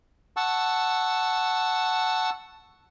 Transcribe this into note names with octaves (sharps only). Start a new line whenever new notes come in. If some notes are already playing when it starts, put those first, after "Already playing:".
F#5 A5 C#6 E6